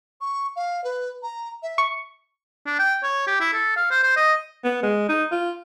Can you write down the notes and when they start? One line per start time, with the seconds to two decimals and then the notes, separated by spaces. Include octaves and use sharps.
0.21 C#6
0.56 F5
0.84 B4
1.23 A#5
1.63 E5
1.78 C#6
2.66 D4
2.79 G5
3.03 C#5
3.27 G4
3.40 E4
3.53 A4
3.77 F5
3.91 C5
4.03 C5
4.17 D#5
4.64 B3
4.83 G#3
5.09 D#4
5.32 F4